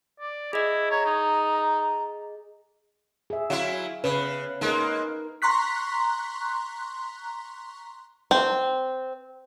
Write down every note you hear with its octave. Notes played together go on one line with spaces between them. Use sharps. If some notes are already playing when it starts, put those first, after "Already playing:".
D5
E4 G#4 D#5
C#5 A#5
D#4
G#4 E5
F#3 E4 F5
C#3 B4
G#3 A#3 D#4 A#4
A#5 C6 C#6 F#6 B6
C4